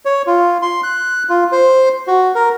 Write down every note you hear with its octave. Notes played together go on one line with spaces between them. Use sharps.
C#5
F4
C6
F#6
F4
C5
F#4
A#4